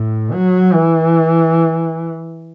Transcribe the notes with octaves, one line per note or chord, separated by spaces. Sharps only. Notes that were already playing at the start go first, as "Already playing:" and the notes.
Already playing: A2
F#3
E3